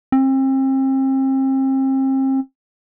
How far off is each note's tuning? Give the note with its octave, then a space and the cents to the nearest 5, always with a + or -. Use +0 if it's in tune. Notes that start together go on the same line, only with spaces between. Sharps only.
C4 +35